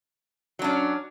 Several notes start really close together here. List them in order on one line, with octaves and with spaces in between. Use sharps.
F#3 D4 C#4